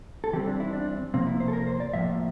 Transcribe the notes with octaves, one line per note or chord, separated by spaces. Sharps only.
A4
E3 G3 C4 G4
D4
E4
D4
C3 F3 A#3 C4
E4
C5
A4
A#4
C5
D5
A2 F3 A#3 E5